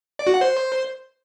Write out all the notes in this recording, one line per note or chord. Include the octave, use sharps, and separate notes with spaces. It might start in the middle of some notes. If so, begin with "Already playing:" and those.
D5
F#4
F#5
C5